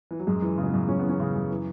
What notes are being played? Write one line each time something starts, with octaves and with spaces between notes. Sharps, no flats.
E3
F#3
F#2 G#3
E3
C#3
G#3
B3
F#2
F#2 C#4
E3 B3
C#4
C#3
F#2
E3